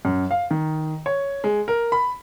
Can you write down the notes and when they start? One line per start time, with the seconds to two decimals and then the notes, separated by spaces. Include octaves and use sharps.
0.05 F#2
0.31 F5
0.51 D#3
1.06 C#5
1.44 G#3
1.68 A#4
1.92 B5